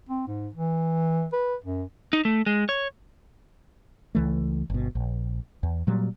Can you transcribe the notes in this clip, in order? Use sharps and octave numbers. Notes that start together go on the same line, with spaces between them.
C4
G#2
E3
B4
F#2
D#4
A3
G#3
C#5
C#2 E3 A3
G1 B2
A#1
E2
A#2 F#3 G3